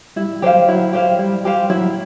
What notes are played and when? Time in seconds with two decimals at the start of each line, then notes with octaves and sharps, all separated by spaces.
0.16 G3 E4
0.42 F#3 G4 C5 F5
0.68 F#3 E4
0.93 G4 C5 F5
1.19 G3 E4
1.45 G4 C5 F5
1.70 F#3 E4